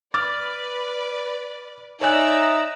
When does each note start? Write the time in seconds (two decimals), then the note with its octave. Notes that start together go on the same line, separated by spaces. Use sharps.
0.14 B4 D5 D6 F6 A6
2.01 D#4 C#5 D5 E5 G#5 A#5 E6 F#6